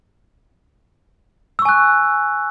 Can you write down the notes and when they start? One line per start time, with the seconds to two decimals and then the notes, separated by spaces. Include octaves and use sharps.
1.59 E6
1.62 C#6
1.65 G#5
1.69 F#6